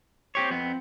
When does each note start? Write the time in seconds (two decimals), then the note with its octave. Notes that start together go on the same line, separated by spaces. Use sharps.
0.35 C4 G4 C#5
0.51 F2 B3 C4